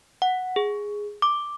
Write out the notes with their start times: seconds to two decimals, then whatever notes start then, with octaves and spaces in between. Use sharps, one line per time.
0.22 F#5
0.56 G#4
1.22 D6